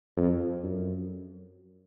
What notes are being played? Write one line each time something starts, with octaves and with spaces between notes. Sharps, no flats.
F2
F#2